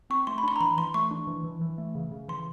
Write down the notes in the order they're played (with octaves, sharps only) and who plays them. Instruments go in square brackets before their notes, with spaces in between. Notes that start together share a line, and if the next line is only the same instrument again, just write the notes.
[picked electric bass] C4 [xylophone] C#6
[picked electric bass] A3 [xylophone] C6
[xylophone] B5
[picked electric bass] D4 [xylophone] C6
[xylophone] A#5
[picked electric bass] E3 [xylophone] B5
[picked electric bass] E3 [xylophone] C6
[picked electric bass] A3 [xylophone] C#6
[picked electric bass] D4
E3
E3
E3
A3
C#3
C#3
[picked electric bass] E3 [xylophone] C6